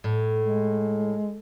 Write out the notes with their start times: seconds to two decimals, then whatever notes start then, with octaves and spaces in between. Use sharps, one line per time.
0.04 A2
0.42 G#3